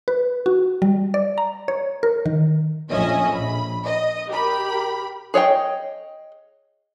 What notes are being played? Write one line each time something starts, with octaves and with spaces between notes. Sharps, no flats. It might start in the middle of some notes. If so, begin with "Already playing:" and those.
B4
F#4
G3
D5
A#5
C#5
A#4
D#3
A#1 F2 C#4 D#5 E5 G#5
A#1 B5
D#5
G4 A#4 B5
G#4 C#5 D#5 G5